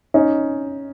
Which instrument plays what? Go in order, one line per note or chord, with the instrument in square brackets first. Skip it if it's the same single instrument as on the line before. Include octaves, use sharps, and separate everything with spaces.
[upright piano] C#4 D#4